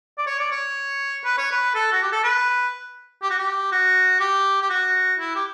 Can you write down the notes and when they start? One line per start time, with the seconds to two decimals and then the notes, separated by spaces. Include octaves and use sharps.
0.18 D5
0.27 C#5
0.39 D5
0.51 C#5
1.25 B4
1.38 C#5
1.51 B4
1.75 A4
1.92 F#4
2.03 G4
2.12 A4
2.24 B4
3.22 G4
3.31 F#4
3.39 G4
3.72 F#4
4.20 G4
4.62 G4
4.70 F#4
5.19 E4
5.36 G4